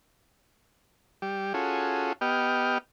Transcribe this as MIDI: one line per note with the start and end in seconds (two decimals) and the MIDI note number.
1.22 1.53 55
1.22 1.53 67
1.54 2.13 61
1.54 2.13 65
1.54 2.13 66
1.54 2.13 68
1.54 2.13 69
2.21 2.78 59
2.21 2.78 67
2.21 2.78 75
2.21 2.78 79
2.21 2.78 89